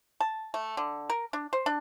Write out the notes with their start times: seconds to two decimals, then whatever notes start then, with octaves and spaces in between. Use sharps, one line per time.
0.20 A5
0.54 A3
0.77 D3
1.10 A#4
1.33 D4
1.53 C5
1.66 D4